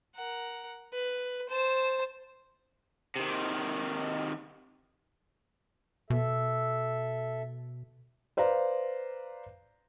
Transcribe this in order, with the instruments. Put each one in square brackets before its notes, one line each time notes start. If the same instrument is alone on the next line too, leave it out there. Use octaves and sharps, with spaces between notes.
[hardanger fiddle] A#4 F#5
B4
C5 A5
[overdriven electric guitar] C3 D#3
[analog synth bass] B2 [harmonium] A4 E5
[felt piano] B4 C5 D5 F5 A#5